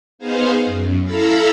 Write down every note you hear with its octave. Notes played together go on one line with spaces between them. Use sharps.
B3 D#4 G#4 C5 F5
F#2
E4 A4 F5 A#5 B5 E6